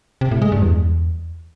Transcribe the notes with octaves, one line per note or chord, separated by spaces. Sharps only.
C3
A2
G#3
G2
E2